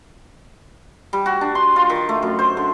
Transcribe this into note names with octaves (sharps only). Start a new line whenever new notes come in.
G3
F#4
D4
C6
F4
D#3
A3
F#2
C5
D3